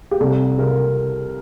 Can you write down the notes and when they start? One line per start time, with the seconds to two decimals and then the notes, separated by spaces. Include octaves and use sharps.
0.11 G4
0.20 C2 A4
0.58 C3 A#4